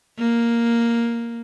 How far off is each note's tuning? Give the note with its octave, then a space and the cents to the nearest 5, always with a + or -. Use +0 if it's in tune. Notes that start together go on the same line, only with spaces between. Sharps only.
A#3 +0